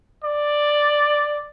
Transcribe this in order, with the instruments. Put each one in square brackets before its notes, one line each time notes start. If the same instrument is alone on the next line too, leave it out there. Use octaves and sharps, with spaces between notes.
[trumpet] D5